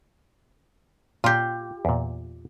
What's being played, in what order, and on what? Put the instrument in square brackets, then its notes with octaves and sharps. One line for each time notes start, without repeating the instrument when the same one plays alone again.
[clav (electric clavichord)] A#2 [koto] F4 G4
[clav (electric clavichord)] E2 A#2